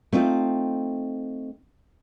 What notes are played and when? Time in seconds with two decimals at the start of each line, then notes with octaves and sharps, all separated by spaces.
0.13 A3 C4 D#4 F4